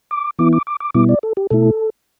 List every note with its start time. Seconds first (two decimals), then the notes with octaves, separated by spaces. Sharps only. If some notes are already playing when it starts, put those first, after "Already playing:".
0.11 D6
0.39 E3 B3 E4 D6
0.53 D6
0.67 D6
0.80 D6
0.94 B2 G3 B3 E4 D6
1.09 D5
1.23 A4
1.37 G4
1.50 B2 A3 E4 A4